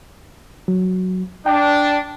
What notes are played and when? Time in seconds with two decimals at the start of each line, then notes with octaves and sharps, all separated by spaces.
0.68 F#3
1.46 D4 G5